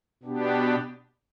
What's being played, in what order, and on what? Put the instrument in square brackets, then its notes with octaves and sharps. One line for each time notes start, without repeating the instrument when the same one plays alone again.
[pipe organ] B2 B3 D4 G4